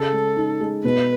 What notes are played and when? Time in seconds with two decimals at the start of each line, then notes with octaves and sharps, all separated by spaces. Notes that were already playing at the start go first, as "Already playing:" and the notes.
Already playing: C#3 A4
0.12 G#3
0.37 D#4
0.60 G#3
0.85 B2 B4